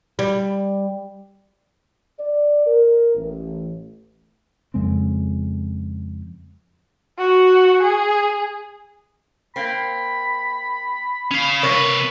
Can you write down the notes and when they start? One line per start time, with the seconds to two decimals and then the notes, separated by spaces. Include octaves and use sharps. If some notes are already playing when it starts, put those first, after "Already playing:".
0.19 G3
2.19 D5
2.66 A#4
3.15 A1
4.74 F2 C#3 G#3 C4
7.18 F#4
7.83 G#4
9.56 A#3 C4 B5
11.31 C#4 F5
11.63 C3 A#4 B4 C#5